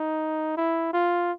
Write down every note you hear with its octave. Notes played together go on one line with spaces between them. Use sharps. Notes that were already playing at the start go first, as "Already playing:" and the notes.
Already playing: D#4
E4
F4